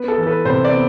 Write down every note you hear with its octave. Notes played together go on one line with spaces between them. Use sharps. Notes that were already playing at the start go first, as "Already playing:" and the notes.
Already playing: B3 B4
A4
E3
A4
B4
C3 C5
D5
B3